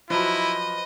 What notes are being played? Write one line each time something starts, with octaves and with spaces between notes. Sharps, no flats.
F3 F#3 E4 B4 C5 D#5